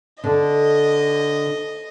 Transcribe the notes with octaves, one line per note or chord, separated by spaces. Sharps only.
D3 D#5